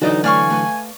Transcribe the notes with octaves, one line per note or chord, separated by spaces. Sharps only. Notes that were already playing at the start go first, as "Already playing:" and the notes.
D3 E3 F#3 D#4 F#4 D5 D#5
A3 C#5 D5 F5 G#5 C#6
A3 B4